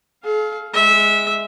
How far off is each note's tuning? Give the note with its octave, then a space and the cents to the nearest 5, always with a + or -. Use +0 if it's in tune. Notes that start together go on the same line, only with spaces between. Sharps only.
A4 -45 F5 +0
G#3 +0 E5 -15